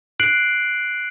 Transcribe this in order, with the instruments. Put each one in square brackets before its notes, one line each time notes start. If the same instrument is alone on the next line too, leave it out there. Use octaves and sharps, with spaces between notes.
[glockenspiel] F#6 C7 D7 F#7